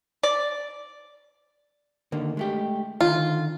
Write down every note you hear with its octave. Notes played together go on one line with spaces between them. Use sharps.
D5
D3 D#3 A#3
G#3 A3 G4
D3 D#3 F4